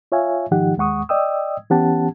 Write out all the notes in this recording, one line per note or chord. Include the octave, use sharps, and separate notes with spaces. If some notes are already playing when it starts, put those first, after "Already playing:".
F4 C#5 E5 F5 G#5
G#2 D#3 F3 D#4 G4 F#5
D#2 G#3 F#5 C#6 D#6
D5 D#5 G5 D#6 E6
E3 B3 C#4 G4 F#5 A5